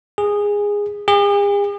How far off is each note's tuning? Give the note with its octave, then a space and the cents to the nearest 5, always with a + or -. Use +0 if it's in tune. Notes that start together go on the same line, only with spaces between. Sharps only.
G#4 -15
G#4 -45